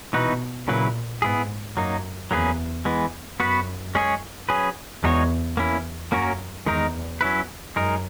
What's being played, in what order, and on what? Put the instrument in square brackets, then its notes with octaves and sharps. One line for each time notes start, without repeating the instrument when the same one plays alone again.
[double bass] B2 [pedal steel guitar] E3 B3 D#4 F#4 B4
[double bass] A#2 [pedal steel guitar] C#3 F#3 A#3 E4 B4
[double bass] G#2 [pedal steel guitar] B3 E4 G#4
[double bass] F#2 [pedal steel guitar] F#3 A#3 D#4
[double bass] E2 [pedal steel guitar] F#3 A#3 C#4 G#4 B4
[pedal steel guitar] E3 G#3 B3
[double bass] F#2 [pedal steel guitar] B3 F#4 B4
[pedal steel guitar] G#3 C#4 G#4 C#5
F#3 C#4 G#4 B4
[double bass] E2 [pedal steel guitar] G#3 D#4 F#4 C#5
[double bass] E2 [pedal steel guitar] A#3 C#4 E4
[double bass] F#2 [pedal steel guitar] F#3 A#3 C#4 F#4 A#4
[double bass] E2 [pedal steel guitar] D#3 G#3 D#4 A#4
[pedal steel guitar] F#3 C#4 E4 B4
[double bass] F#2 [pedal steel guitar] G#3 D#4 A#4